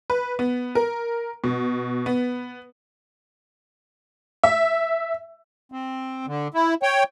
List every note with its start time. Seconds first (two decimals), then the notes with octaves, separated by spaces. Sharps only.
0.10 B4
0.39 B3
0.75 A#4
1.44 B2
2.06 B3
4.44 E5
5.72 C4
6.26 D3
6.54 E4
6.83 C#5 G5